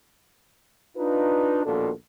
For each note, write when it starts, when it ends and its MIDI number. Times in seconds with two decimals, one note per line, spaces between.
0.97 1.65 62
0.97 1.65 63
0.97 1.65 65
0.97 1.65 71
1.65 1.91 34
1.65 1.91 39
1.65 1.91 47
1.65 1.91 62
1.65 1.91 65
1.65 1.91 69